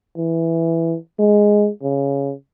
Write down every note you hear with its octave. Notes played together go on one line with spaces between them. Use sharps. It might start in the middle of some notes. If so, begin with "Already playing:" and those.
E3
G#3
C#3